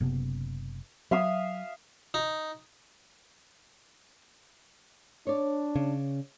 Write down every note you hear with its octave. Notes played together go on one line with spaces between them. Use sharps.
F#1 C3 B3
F#3 E5 F5 D#6
D#4
D4 C#5 D5
C#3